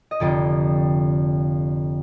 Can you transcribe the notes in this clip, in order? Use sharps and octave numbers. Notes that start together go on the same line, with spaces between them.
D#5
F1 F2 D3 D5